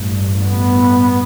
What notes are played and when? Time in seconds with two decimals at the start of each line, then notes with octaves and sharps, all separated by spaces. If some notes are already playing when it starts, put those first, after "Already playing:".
Already playing: A1 G2
0.38 B3